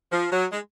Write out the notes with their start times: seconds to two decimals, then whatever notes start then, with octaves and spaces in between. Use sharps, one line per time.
0.12 F3
0.31 F#3
0.52 G#3